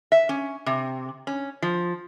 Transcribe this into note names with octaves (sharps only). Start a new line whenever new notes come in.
E5
C#4
C3
C#4
F3